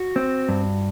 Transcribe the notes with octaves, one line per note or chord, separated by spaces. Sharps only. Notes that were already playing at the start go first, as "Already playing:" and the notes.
Already playing: F#4
C4
G2